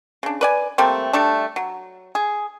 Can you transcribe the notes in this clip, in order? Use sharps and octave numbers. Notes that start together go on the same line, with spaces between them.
C#3 D4
B4 D5 G#5
G3 A3 A#3 C4
G3 A3 D4
F#3
G#4